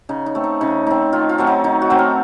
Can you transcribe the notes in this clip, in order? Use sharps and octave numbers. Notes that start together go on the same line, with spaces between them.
C#3 D#4
D#4
A3 C4
D#4
C#3 D#4
A3 C4 D#4
D#3 F4
F4
F#3 A3 C4
D#4
D#3 D#4
F#4
F#3 A3 C4
A#4